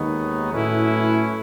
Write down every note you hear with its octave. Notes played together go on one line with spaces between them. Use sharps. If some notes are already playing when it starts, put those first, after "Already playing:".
Already playing: D#2 D#3 G#3 B3 D#4 C#5
A2 F#3 A3 C#4 E4 B4